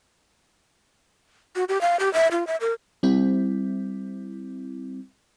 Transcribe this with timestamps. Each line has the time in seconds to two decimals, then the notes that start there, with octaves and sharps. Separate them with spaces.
1.56 F#4
1.69 G4
1.81 F5
2.00 G4
2.14 E5
2.32 F4
2.47 E5
2.61 A#4
3.03 G3 C4 E4